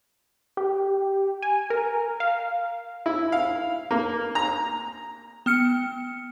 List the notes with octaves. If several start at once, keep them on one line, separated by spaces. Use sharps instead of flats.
G4
G#5
A#4
F5
E4
F5
A#3
A#5
B3 F6 C#7